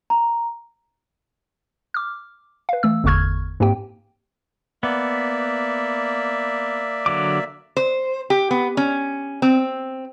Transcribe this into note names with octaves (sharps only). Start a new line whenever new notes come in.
A#5
D6 F6
B4 F5
E3 A3 E6
G1 E2 D3 C#6 F6 G#6
G#2 A#3 C4 G4 G5
A#3 B3 D5 E5
D3 F#3 D6
C5
G4
B3
C#4
C4